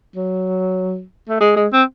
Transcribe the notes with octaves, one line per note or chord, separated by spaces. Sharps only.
F#3
A3
G#3
G#3
C4